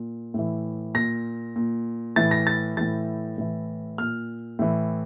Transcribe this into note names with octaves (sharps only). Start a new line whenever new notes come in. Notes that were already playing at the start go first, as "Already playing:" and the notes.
Already playing: A#2
A2 E3
A#2 A#6
A#2
A2 E3 A6
A#6
A6
A2 E3 A6
A2 E3
A#2 F6
A2 E3